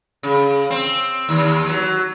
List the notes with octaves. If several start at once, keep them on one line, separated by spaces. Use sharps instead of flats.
C#3
C4
D#2
F#3